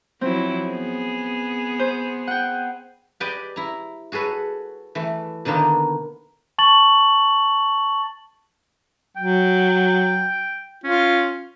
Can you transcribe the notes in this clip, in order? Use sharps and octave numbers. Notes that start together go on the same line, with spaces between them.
F3 F#3 C4 E4
B3 G#4
C5
F#5 G5
G4 B4 D5 D#5 G5 G#5
E4 A#5
F#4 G#4 A4 B4 C#5
E3 A3
B2 D3 D#3 A#3 B3
A5 C#6 A6 F#7
F#3 G5
C#4 F4